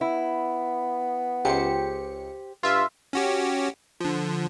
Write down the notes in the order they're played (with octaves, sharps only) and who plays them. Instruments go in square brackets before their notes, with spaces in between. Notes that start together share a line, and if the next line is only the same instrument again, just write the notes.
[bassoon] B3 [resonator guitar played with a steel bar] E4
[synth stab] C#2 C#7 [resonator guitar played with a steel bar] G4 C5
[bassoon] G2 [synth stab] F4 E5
[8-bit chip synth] C#4 F#4 G4
D3 F3